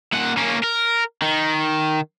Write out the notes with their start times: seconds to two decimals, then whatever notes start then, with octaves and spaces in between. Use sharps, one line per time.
0.13 A#2 F#5
0.37 A#3 C#4
0.64 A#4
1.22 D#3